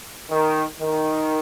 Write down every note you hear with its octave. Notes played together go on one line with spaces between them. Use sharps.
D#3
D#3